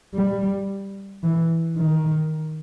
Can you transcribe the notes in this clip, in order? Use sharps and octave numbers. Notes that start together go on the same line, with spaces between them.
G3
E3
D#3